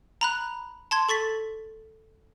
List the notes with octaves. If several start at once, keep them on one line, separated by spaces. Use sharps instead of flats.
A#5 B5 F#6
A5 C6 G#6
A4 C#6 A6 B6